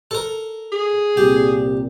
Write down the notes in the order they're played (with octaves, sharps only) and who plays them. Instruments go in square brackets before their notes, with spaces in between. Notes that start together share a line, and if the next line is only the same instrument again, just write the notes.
[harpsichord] A4 A#4
[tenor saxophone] G#4
[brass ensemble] C2 A#2 [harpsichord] G4